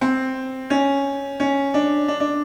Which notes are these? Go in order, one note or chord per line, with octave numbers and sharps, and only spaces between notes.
C4
C#4
C#4
D4
D4
D4